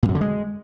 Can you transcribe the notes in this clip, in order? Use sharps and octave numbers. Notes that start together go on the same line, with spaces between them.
A#2
F#2
D3
G#3